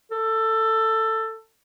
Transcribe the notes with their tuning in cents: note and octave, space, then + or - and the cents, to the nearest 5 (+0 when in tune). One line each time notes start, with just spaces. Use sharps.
A4 +15